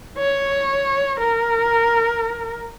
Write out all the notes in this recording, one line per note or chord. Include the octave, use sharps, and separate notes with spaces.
C#5
A#4